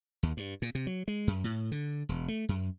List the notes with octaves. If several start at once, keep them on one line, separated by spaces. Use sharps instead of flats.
D#2
G2
A#2
C3
F#3
G#3
F#2
A2
D3
E1
A3
F#2